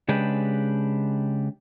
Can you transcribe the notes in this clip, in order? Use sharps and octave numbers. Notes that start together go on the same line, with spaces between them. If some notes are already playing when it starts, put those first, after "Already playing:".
C#3 G#3 D4 G4 B4